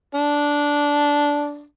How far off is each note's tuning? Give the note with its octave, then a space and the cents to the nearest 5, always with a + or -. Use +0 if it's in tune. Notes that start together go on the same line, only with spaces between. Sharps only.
D4 -10